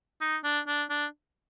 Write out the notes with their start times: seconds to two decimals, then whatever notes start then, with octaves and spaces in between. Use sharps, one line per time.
0.21 D#4
0.44 D4
0.67 D4
0.90 D4